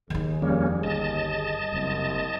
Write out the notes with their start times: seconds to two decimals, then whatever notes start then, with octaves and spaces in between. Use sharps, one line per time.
0.10 D#2 D#3 D#4 G#4
0.42 F2 G3 A#3 C#4
0.83 G1 D#5 A5
1.72 F#1 C2 C3